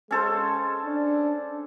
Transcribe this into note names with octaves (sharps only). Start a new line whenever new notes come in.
G#3 C#4 A4 C5
D4